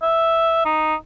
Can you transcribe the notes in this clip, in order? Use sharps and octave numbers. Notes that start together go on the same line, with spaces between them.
E5
D#4